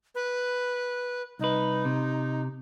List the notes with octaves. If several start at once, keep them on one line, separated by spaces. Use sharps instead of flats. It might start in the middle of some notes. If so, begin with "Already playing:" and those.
B4
C2 D#4 B4
C3